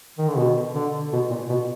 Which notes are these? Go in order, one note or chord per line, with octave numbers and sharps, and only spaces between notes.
D#3
D3
B2
D3
B2
A#2
B2